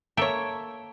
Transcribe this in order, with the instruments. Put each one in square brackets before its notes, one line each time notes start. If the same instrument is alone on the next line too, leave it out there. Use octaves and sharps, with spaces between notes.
[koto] A#3 E5 G5 [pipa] A4 C#5